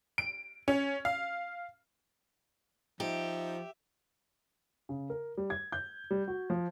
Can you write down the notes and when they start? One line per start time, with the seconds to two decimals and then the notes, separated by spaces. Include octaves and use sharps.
0.18 D7
0.68 C#4
1.05 F5
3.00 F3 D#4 G4 E5
4.89 C#3
5.10 A#4
5.37 G3
5.50 G#6
5.72 G6
6.11 G3
6.28 F#4
6.50 F3